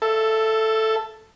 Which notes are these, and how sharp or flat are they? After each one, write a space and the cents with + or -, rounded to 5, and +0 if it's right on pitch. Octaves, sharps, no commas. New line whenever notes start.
A4 +0 E5 +20